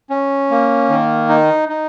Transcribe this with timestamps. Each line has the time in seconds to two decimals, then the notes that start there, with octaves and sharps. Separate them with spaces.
0.10 C#4
0.50 A#3
0.89 D#3
1.29 D#4
1.69 D#4